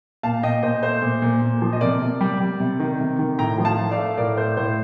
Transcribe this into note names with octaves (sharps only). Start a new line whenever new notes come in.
A#2 F5 A5
A#2 D#5 G5
A#2 C5 D#5
A3 C5
A#2
A#2
A#2
F3
D#5
C3 A#4 D5
C3
G3
G3
C3
D#3
C3
D#3
A2 G5 A#5
F3
F5 A5
A3
D5 F5
A3
A2 A#4 D5
A3 C5
A2 C5